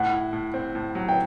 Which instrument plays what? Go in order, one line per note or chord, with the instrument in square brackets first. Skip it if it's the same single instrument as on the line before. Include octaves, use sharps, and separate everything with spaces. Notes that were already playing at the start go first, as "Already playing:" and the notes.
Already playing: [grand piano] A2 [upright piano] F#5
[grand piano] E4
A2
C4
A2
F#3
[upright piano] G5